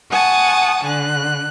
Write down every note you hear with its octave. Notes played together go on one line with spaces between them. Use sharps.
F#5 G#5 A5 C#6 D#6
D3 F#6